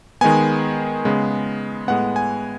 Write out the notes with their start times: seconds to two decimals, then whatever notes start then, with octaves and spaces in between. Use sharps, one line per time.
0.21 D#3 G#3 B3 G#5
1.05 C#3 G#3 B3
1.88 A2 G#3 B3 F#5
2.16 G#5